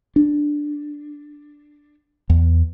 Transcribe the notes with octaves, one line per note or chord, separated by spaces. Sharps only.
D4
E2